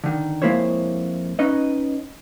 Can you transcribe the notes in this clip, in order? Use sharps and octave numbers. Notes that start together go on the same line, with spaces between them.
D3 D#3
F2 G#3 A#3 E4 C5 C#5
C#4 D#4 B4 D#5